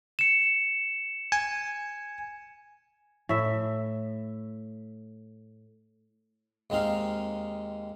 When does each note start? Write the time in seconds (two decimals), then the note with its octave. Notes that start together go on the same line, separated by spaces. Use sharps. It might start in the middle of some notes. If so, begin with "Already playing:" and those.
0.19 C#7 E7
1.32 G#5
3.29 A2 E5
6.70 D#2 G#3 C4 D#4 F5